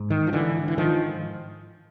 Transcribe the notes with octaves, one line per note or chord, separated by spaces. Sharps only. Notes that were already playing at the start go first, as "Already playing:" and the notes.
Already playing: G#2
D#3
F3
D3 E3
E3
D#3 F3